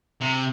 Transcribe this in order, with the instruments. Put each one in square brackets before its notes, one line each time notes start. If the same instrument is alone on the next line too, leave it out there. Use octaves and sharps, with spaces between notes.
[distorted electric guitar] C3